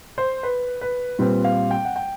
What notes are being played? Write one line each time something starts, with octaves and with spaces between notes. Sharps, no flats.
C5
B4
B4
A#2 G3 C4 B4
F5
G5
F#5
G5